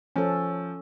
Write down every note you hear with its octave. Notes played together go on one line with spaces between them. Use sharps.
F3 C#4 A4